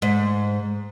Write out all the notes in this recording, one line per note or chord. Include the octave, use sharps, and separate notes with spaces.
G#2